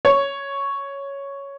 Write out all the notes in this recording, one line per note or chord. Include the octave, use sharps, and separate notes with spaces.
C#5